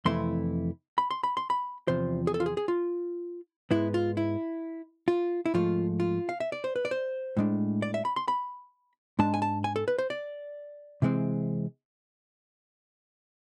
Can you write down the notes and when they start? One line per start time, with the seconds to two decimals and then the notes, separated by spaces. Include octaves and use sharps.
0.05 F2 C3 E3 A3 E4 C6
0.98 B5
1.11 C6
1.23 B5
1.37 C6
1.50 B5
1.88 E2 C3 F3 C5
2.27 G#4
2.34 A4
2.40 F4
2.46 G#4
2.57 G#4
2.68 F4
3.71 G#2 G#3 B3 E4
3.94 F4
4.17 E4
5.08 F4
5.46 E4
5.54 G#2 F3 A3 F4
6.00 F4
6.29 F5
6.40 E5
6.52 D5
6.64 C5
6.76 B4
6.85 D5
6.91 C5
7.37 A2 G#3 D4
7.82 D5
7.94 E5
8.05 B5
8.16 C6
8.28 B5
9.19 G#2 G#3 D4 A5
9.34 G#5
9.42 A5
9.64 G#5
9.76 A4
9.88 B4
9.98 C5
10.10 D5
11.02 C3 E3 G#3 C4